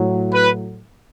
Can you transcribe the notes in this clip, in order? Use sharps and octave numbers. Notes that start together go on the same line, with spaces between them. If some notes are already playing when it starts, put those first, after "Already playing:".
Already playing: A2 F#3
B4